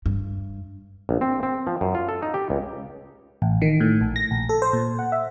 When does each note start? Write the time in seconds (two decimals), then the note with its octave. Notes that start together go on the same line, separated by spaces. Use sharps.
0.06 G2
1.09 A#1
1.21 C4
1.43 C4
1.67 F3
1.81 F#2
1.95 F4
2.09 A4
2.22 D#4
2.34 G4
2.50 C#2
3.42 A1
3.62 D#3
3.80 A2
4.01 A#1
4.16 A#6
4.31 A#1
4.49 A4
4.62 C5
4.73 A#2
4.99 F#5
5.12 E5